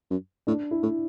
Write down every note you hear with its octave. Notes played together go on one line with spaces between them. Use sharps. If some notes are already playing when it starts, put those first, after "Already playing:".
F#2
A2 D4
E4
A2 E4